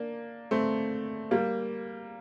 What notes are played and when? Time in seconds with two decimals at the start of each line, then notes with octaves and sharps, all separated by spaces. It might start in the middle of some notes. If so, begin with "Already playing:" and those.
Already playing: A#3 D4
0.51 A3 C4
1.31 G3 A#3